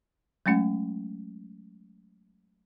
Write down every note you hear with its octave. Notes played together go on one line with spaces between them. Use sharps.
F#3 G#3 A3 C#4 F#5